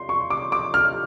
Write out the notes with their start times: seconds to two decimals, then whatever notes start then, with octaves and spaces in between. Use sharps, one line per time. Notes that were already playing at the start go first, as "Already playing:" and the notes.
Already playing: C6
0.09 C#6
0.30 D6
0.52 D6
0.74 F6